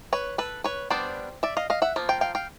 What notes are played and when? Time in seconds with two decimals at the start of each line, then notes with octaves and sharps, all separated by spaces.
0.13 B4 C#5
0.38 A4 B4
0.64 B4 C#5
0.90 G3 B3 D4 C5 D5
1.43 D5 E5
1.57 D#5 F5
1.70 D#5 F5
1.82 E5 F#5
1.96 F3 A#3
2.09 F5 G5
2.21 F5 G5
2.35 F5 G5